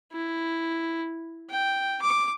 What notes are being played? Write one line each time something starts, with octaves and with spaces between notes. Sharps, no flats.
E4
G5
D6